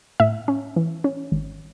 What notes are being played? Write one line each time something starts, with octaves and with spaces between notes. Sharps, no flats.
A2 E5
C#4
E3
C#4
G#1